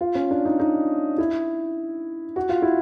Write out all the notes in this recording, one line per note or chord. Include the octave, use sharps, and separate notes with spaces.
F4
C#4
D4
D#4
D#4
E4
F#4
F4
E4